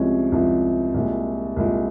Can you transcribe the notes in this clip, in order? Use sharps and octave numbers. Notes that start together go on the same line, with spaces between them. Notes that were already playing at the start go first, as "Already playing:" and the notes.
Already playing: C2 C3 F3 G#3 C#4
C2 C3 F3 G#3 C#4
C2 A#2 G#3
C2 A#2 G#3